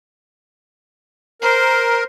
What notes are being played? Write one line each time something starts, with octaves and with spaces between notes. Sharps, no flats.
A#4 C5